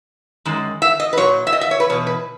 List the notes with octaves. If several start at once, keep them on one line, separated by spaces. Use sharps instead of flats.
F#2 D#3 G#3
E5
D#5
B4
A#2 F#3 C#5
E5
D#5
E5
C#5
B4
E2 B2 F#3 C#5
B4